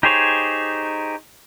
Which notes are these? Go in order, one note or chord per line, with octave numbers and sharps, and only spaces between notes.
D#4 G4 G#4 C5 C#5